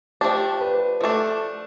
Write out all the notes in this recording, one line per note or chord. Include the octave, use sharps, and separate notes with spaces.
F3 A3 D4 G4
B4
F3 A3 D4 A4